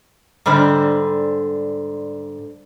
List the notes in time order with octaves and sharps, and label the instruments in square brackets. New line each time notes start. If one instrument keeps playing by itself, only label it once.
[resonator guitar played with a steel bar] G#2 D3 G3 C5 D5